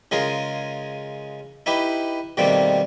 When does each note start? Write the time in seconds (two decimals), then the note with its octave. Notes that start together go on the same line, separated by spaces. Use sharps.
0.11 C#3 G#3 F4 G#4 A#4
1.66 D#4 E4 G4 B4
2.37 B2 D#3 G3 A3 A#3 C4